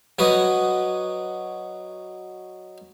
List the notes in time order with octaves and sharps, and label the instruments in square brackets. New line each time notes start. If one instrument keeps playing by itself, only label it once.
[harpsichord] F#3 F#4 B4 D#5